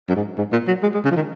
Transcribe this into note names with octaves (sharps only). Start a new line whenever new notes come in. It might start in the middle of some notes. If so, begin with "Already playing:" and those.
F#2
G#2
G#2
A#2
F#3
G#3
G#3
C#3
F3
D#3